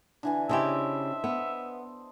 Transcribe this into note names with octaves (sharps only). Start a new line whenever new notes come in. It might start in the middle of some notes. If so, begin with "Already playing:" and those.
D3 E3 G#5
C#3 E4 G4 C5 D#5 E5 A5
B3